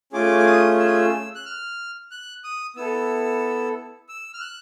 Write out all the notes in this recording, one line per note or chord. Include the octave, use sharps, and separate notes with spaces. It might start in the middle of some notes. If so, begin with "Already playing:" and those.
A3 C#4 F4 G#4 D6
D6
D#6
E6
D#6
E6
F#6
F6
F#6
D#6
B3 E4 A4 E6
E6
F6
F#6